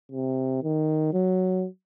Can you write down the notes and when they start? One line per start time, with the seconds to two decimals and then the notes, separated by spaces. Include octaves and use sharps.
0.12 C3
0.63 D#3
1.13 F#3